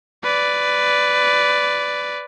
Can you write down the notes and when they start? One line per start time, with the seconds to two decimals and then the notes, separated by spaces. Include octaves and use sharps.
0.24 B4 D5